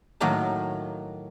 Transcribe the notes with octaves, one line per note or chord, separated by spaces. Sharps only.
A2 D#3 F#3 A#3 D#4 A5